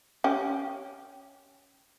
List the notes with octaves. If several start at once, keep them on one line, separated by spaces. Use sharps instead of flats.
C#4 G4